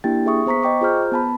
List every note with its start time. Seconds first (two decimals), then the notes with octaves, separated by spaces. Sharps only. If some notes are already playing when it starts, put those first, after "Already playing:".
0.04 A#3 D4 E4 G4 G5 A6
0.26 G#4 E5 C#6 D#6
0.46 B3 C5 A#5 C#6 B6
0.63 D#5 G5 C#6 D6
0.81 F4 G#4 C5 A#5 F6 G6
1.12 B3 A5 B5